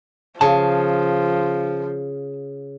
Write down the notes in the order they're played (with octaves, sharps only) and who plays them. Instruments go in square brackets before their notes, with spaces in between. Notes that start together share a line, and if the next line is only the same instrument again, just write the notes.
[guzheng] C#3 [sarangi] F3 [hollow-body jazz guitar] A5